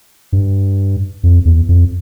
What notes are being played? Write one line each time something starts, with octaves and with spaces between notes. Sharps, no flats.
G2
F2
E2
F2